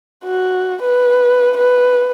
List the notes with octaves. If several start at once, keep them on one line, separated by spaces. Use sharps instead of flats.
F#4
B4
B4